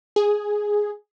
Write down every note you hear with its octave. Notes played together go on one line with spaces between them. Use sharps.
G#4